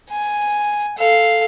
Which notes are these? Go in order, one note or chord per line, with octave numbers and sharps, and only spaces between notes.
G#5
A4 F5